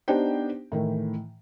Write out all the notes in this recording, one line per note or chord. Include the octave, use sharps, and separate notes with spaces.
B3 D4 D#4 G4 C5 G5
A2 D#3 E3